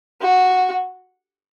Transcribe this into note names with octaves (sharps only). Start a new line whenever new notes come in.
F#4